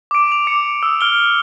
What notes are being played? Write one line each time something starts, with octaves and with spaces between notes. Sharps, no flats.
D6 D7
F7
D6 C#7
D#6 E6 D7
F6 D7 G7